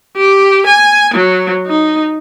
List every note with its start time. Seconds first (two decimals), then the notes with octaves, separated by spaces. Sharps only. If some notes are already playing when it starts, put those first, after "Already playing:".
0.17 G4
0.67 G#5
1.14 F#3
1.67 D#4